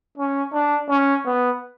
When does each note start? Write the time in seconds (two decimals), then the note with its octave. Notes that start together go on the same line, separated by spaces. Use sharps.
0.18 C#4
0.53 D4
0.89 C#4
1.26 B3